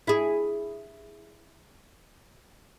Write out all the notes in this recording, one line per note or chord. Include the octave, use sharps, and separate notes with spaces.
E4 G#4